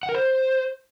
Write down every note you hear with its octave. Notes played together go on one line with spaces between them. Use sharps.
F#5
A#4
C5